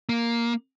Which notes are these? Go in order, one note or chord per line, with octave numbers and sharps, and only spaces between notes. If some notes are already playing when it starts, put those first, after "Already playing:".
A#3